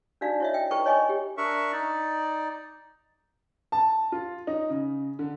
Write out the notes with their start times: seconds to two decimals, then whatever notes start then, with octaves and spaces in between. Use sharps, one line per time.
0.21 D4 D#4 F#4 D5 F5
0.40 E4 F#4 C#5 D#5 E5
0.54 E5 G5
0.71 D#4 A4 B4 G5 B5 C#6
0.86 C#5 D#5 G#5 B5 C#6 D6
1.09 G4
1.37 D4 A#4 E5 C#6
1.72 D#4 D5
3.72 A5
4.12 F4
4.47 D#4
4.70 C#3
5.19 D3